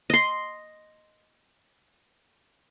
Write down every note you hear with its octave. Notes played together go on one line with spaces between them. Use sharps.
D#5 C6